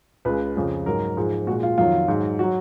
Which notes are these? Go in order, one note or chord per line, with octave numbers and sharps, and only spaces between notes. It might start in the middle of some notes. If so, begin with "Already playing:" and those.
C#2 C#3 G#3 B4
F2 C#3 F3
G#2 F#3 A#4
G#2 F3 G#3
A#2 G#3 F#4
F4
F2 D#3 F#3 F4
G#2 F#3
F#3 F#4